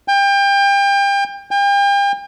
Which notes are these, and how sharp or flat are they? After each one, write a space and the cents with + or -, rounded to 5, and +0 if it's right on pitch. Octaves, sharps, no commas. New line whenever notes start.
G5 +30
G5 +40